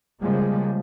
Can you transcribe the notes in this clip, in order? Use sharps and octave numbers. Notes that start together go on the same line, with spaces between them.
C#3 F3 G3 G#3 A#3